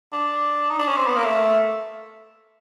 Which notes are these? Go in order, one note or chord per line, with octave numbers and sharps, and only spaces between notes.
D4
D#4
D4
C#4
C4
B3
A#3
A3